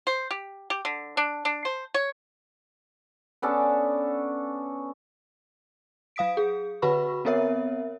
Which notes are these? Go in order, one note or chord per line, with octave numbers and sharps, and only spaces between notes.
C5
G4
G4
D3
D4
D4
C5
C#5
B3 C#4 D4 A4
F#3 F5 D#6 B6 D7
G#4
D3 F#4 B4 F#5 B5 C#6
B3 C4 A#4 C#5 E5